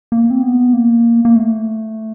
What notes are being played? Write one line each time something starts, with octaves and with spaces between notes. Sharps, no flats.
A#3
C4
B3
A#3
A#3
A3